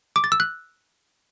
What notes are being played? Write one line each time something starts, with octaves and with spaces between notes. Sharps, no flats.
D6
A6
E6
F#6